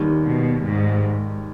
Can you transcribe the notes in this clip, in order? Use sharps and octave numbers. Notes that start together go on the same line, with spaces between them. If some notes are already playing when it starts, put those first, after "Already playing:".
Already playing: D#2 D#3 G3
B2
G#2